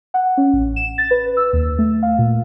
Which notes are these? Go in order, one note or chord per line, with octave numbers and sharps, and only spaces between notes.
F#5
C#4
A1
E7
A6
B4
E6
D#2
A3
F5
A#2